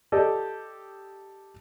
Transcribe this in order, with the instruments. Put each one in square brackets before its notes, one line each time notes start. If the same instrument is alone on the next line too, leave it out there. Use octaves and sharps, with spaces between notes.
[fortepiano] G4 A4 D5 D#5